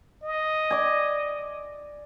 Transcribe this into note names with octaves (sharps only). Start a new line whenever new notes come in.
D#5
D5 G#5